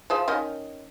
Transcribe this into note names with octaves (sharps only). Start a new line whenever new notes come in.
F3 G#4 E5
D#3 C#4 D#5